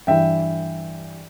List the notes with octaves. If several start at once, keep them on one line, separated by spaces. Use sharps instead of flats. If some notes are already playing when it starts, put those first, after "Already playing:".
G2 E3 E5 G5